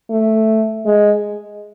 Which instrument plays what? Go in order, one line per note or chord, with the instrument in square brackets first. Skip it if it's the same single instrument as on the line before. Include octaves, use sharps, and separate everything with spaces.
[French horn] A3
G#3